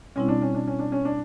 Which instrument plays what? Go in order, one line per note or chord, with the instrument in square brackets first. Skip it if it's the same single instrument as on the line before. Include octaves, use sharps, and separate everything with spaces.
[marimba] B2 G3 C4 E4 [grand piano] C#4
[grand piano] D4
C#4
D4
C#4
D4
C#4
D4